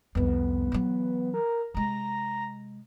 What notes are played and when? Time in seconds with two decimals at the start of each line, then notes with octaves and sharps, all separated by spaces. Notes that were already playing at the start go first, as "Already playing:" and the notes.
0.15 C2 F2 B3
0.72 E3 F#3
1.34 A#4
1.74 C3 G#3 A#5